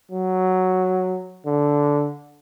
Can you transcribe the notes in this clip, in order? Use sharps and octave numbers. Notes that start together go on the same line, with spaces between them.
F#3
D3